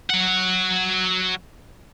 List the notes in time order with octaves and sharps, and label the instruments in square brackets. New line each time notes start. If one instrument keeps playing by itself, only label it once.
[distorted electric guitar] F#3 F#5